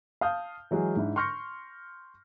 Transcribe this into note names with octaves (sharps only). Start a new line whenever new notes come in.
F5 A5 D#6 F6 G6
E3 F#3 G#3 G#4
G#2 D4 E4
C6 C#6 F6 G6 A#6 C#7